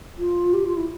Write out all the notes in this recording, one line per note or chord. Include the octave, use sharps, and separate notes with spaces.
F4
G4
F4
E4